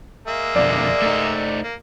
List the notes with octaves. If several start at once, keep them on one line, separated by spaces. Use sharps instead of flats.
G#3 A#3 E5
F2 B2 D3 D5
A3 D#4
A#3